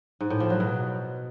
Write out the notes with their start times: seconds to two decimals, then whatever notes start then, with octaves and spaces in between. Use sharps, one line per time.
0.21 G#2
0.30 A2
0.40 F3
0.50 F#3
0.60 B2